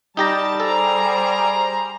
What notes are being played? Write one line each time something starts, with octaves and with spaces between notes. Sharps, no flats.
G3 D#4 G4 A5 A#5
G#4 A4 C5 A#5